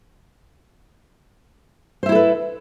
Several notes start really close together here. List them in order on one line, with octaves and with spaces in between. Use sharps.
C5 E5 E4 A4 B4